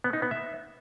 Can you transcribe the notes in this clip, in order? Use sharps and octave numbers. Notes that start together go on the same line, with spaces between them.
B3
D#4
B3
E5